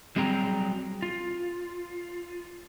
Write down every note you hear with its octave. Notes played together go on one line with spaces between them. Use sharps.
F#3 G3 C4 G#4 G5 A#5
F4